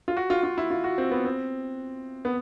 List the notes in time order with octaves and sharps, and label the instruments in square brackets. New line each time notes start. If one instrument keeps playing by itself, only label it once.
[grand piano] F4
F#4
F4
F4
E4
F4
F#4
C4
B3
C4
B3